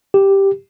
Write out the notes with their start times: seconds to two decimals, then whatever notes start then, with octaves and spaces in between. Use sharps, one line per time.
0.14 G4